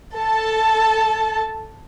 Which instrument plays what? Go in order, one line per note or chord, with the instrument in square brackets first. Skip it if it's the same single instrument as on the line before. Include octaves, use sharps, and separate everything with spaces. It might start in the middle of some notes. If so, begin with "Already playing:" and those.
[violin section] A4 A5